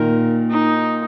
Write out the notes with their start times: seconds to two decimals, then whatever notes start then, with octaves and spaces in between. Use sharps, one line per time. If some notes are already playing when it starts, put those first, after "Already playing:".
Already playing: A#2 D#3 A#4
0.50 D#4